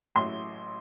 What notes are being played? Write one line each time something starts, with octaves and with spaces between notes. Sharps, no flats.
A1 A2 F#3 C6